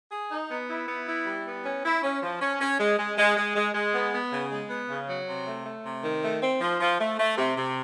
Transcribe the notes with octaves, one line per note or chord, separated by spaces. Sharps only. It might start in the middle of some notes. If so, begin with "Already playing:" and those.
G#4
D#4
B3
E4
B3
E4
G3
B3
C#4
E4
C#4
F3
C#4
C#4
G#3
G#3
G#3
G#3
G#3
G#3
B3
B3
C#3
G#3
B3
C#3
F#3
C3
A3
A3
C3
D#3
A3
C4
F3
F3
A3
A3
C3
C3